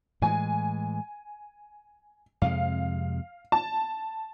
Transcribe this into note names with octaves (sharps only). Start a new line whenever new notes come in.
A2 E3 G#3 G#5
F2 C3 G#3 F5
A5